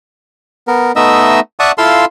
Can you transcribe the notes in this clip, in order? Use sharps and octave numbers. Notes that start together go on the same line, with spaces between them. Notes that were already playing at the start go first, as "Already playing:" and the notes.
B3 A#4
A3 B3 D#4 D#5 E5 E6
D5 E5 F#5 A5 C#6 D#6
E4 F4 A4 F5 C6 E6